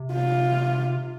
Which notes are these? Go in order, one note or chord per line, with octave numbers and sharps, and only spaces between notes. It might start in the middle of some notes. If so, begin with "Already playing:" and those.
Already playing: C3
F4